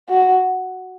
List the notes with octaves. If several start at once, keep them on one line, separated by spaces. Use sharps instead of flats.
F#4